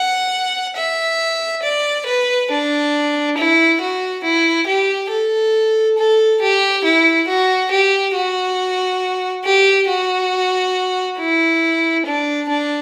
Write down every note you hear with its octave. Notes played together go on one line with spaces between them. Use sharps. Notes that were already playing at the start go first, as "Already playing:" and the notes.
Already playing: F#5
E5
D5
B4
D4
E4
F#4
E4
G4
A4
A4
G4
E4
F#4
G4
F#4
G4
F#4
E4
D4
D4